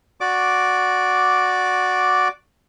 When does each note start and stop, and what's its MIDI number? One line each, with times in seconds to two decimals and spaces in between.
0.21 2.28 66
0.21 2.28 74
0.21 2.28 86